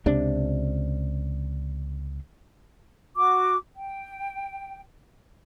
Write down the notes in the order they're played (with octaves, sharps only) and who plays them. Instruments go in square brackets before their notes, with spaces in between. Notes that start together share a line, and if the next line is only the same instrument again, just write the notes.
[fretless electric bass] C#2 C3 D4
[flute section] F#4 D6
G5